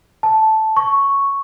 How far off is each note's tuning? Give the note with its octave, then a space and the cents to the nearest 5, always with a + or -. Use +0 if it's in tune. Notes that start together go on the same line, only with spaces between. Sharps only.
A5 -5
C#6 +0